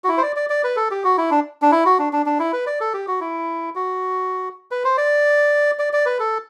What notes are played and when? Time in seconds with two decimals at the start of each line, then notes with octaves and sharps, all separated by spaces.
0.04 F#4
0.08 E4
0.18 C5
0.23 D5
0.36 D5
0.50 D5
0.64 B4
0.76 A4
0.91 G4
1.04 F#4
1.18 E4
1.31 D4
1.62 D4
1.72 E4
1.86 F#4
1.99 D4
2.13 D4
2.26 D4
2.40 E4
2.53 B4
2.67 D5
2.81 A4
2.94 G4
3.08 F#4
3.21 E4
3.75 F#4
4.71 B4
4.84 C5
4.98 D5
5.79 D5
5.93 D5
6.06 B4
6.20 A4